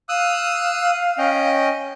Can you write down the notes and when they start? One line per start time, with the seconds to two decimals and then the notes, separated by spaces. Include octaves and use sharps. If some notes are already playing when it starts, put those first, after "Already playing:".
0.09 F5 D#6 E6 F#6
1.18 C#4 D#5 G5